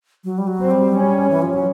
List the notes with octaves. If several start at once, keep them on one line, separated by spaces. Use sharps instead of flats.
F#3
G3
F#3
C4
G3
C#4
E3
F3
F#3